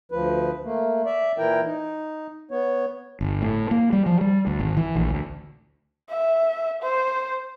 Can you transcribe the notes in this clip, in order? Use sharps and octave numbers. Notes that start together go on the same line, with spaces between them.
D2 F3 B4
A3 A#3
D5 E5
A#2 E3 E4 A#4 G5
D#4
B3 C#5
G1
A2
A#3
G3
F3
G3
D2
G#1
E3
A#1
D2
E5
C5